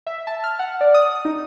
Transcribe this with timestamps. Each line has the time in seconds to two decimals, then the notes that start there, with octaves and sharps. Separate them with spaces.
0.07 E5
0.27 A5
0.44 F6
0.59 F#5
0.81 D5
0.94 D#6
1.25 D#4